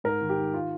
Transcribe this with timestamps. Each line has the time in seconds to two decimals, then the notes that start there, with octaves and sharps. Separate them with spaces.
0.04 G#2 A#4
0.21 D#3
0.29 G4
0.37 D#3
0.54 F4